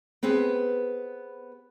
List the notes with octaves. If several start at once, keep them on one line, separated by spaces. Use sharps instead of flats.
B3 C4 G4 G#4 B4